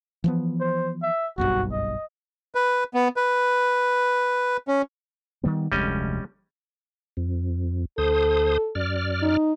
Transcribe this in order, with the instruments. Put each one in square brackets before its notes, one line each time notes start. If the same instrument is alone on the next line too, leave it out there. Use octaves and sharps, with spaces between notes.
[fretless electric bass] E3 F3 B3
[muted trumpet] C5
E5
[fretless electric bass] F#1 B1 G2 [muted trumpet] F#4
[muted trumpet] D#5
[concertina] B4
B3
B4
C#4
[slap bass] D#3 G3 B3
[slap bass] F1 D2 G#3 [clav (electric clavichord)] G3 C#4 D#5
[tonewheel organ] F2
[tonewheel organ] D2 C5 D#6 [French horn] A4
[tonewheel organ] F#2 D5 F6
[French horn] D#4